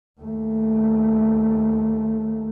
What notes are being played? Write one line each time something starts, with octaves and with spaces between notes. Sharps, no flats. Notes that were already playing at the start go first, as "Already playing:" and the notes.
D#2 A3